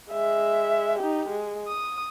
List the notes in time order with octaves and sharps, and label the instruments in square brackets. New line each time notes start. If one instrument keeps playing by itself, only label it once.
[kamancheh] G#3 E5
D#4 G4
G#3
D#6